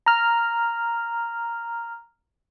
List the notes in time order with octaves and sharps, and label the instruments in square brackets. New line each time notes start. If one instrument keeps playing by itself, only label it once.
[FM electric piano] A#5 F6